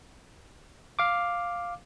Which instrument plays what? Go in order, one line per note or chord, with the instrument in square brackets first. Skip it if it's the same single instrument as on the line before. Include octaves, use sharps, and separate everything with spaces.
[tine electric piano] F5 D6